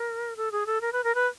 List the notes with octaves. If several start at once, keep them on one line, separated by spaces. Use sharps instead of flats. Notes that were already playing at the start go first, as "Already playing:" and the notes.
Already playing: A#4
A4
G#4
A4
A#4
B4
A#4
B4